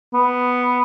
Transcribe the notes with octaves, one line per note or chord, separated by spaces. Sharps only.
B3